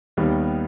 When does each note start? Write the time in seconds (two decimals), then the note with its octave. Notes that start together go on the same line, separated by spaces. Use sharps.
0.17 D#2 D#3 G3 B3